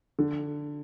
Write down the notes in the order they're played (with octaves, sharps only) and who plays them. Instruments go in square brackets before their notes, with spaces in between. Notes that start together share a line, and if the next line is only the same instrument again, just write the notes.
[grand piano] D3